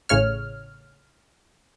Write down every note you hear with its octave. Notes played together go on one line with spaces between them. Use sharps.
A1 A2 C#3 C#5 F6